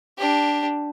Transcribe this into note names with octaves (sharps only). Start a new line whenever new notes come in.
D4 G4